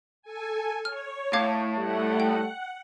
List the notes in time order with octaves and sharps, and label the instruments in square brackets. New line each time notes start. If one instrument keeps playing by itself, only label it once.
[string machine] A4 G#5
[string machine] C#5 [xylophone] F6
[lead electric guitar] A2 [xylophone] F5 D6 G#6
[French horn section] G3 A3 [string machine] F#5
[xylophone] G5